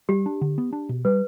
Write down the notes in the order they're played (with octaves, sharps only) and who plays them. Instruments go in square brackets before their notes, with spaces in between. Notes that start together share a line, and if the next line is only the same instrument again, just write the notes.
[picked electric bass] G3 [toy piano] G4
[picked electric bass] D4
D3
B3
D4
B2
[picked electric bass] G3 [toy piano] B4